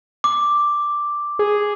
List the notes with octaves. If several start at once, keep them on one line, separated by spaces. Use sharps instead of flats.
D6
G#4